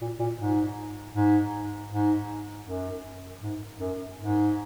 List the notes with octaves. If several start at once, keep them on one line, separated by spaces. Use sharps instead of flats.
A#2
A#2
G#2
G#2
G#2
F#2
G#2
F#2
G#2